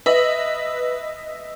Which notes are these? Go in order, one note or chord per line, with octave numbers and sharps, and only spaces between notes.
B4 D#5 E5